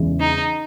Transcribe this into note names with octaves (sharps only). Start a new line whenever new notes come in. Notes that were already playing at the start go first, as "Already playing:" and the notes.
Already playing: E2 C#3 E3 G#3
D#4